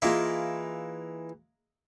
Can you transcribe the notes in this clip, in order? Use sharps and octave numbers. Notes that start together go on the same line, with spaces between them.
E3 G#3 A#3 E4 F4